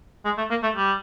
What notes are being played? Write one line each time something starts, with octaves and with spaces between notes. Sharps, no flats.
G#3
A3
A#3
A3
G3